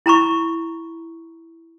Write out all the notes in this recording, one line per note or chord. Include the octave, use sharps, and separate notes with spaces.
E4 A#5 B5 C#6